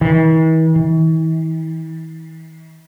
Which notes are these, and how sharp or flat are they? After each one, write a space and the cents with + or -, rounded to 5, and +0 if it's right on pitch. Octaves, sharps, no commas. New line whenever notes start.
E3 -45
E3 -40